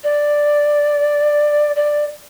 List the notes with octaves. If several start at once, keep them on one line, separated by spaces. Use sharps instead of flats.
D5
D5